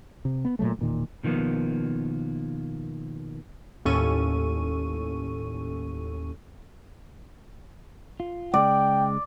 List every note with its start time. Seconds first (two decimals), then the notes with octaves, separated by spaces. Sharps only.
0.25 C3
0.45 B3
0.59 A#2 C#3 F#3 A3
0.79 E1 A#2 D#3
1.24 B2 D#3 F3 A#3 B3
3.85 D#2 A2 C#4 A4 C#6 D#7
8.20 F4
8.54 C#3 G#3 D5 G5